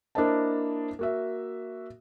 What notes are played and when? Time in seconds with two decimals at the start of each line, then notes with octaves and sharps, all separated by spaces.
0.15 A#3 D4 E4 C5 D#5 A5
0.99 A#3 F#4 E5